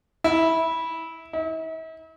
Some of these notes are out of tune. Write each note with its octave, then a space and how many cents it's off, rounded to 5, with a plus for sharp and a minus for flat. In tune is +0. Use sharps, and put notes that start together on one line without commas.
E4 -15
E4 -45